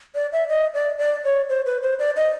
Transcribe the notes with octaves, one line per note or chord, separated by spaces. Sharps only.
D5
E5
D#5
D5
D5
C#5
C5
B4
C5
D5
D#5